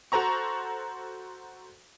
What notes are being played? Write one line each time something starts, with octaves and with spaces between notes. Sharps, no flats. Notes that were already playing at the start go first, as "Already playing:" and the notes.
F#4 A4 C5 A#5 C#6